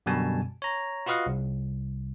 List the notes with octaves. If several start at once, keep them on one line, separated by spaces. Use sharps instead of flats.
F#2 B2 D3 G3 G#5 A5
C#5 A#5
F4 F#4 B4 D#5 F5 F#5
C2